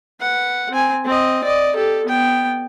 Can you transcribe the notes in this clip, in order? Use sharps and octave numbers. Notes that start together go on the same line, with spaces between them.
B4 F#5
C4 G#5
C4 D#5
D5 D#5
G4 A4
B3 G5